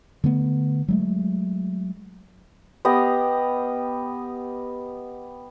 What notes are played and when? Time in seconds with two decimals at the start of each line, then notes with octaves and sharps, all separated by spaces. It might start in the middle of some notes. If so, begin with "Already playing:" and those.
0.24 D3 A3 B3
0.88 F#3 G#3 A3
2.85 B3 G4 D#5 F5